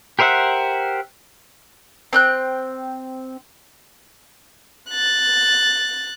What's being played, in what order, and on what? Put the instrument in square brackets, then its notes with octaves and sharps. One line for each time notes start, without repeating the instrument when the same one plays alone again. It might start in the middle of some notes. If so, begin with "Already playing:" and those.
[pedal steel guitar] G4 A#4 C5 E5 F#5
[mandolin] C4 G5 F#6
[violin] F#6 A6